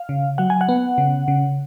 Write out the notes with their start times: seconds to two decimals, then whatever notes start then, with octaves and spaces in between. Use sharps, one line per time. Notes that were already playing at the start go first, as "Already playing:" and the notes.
Already playing: F5
0.09 C#3
0.38 F#3 F#5
0.50 G#5
0.61 F#5
0.69 B3
0.98 C#3
1.28 C#3